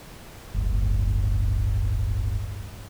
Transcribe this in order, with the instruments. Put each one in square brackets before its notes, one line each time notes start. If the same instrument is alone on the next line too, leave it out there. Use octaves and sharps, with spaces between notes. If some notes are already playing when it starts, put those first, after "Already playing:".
[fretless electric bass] D1 G1